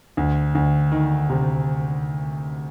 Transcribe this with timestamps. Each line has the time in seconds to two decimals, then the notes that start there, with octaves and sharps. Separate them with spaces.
0.17 D2
0.55 D2
0.92 D#3
1.30 C3